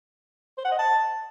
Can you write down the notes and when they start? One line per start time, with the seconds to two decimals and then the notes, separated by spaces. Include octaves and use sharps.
0.58 C5
0.65 F#5
0.72 D#5
0.79 A5